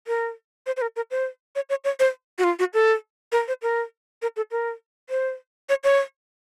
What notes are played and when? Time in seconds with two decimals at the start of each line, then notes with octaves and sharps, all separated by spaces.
0.07 A#4
0.66 C5
0.77 C5
0.82 A#4
0.96 A#4
1.11 C5
1.55 C#5
1.70 C#5
1.84 C#5
2.00 C5
2.38 F#4
2.44 F4
2.59 F#4
2.74 A4
3.32 A#4
3.48 C5
3.62 A#4
4.22 A#4
4.36 A4
4.51 A#4
5.10 C5
5.69 C#5
5.84 C#5